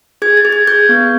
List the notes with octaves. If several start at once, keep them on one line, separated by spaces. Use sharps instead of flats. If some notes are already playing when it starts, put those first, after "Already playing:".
G#4 G#6
A6
G#4
G#6
G#4 G6
B3